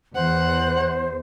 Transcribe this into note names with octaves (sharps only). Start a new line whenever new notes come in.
E2 C5 F#5